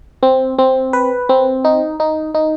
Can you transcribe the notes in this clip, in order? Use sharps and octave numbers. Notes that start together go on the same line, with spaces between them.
C4
C4
B4
C4
D#4
D#4
D#4